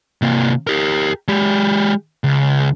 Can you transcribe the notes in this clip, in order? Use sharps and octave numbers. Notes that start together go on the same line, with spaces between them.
C3 A#3
G4 A#4
G#3 G4
C#2